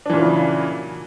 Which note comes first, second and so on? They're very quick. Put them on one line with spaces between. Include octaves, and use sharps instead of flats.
D4 E3 A#2 F#3 C#3